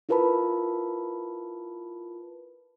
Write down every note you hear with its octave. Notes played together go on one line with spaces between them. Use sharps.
E4 F4 A#4 B4 A5 B5